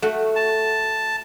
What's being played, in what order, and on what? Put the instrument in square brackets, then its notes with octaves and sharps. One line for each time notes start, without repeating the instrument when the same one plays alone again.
[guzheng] A3 F#4
[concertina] A5